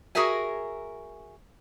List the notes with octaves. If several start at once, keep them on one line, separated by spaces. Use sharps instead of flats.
F#4 G#4 A#4 E5 G#5